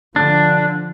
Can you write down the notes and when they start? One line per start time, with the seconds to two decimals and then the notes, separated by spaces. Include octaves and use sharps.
0.16 D3 F3 D4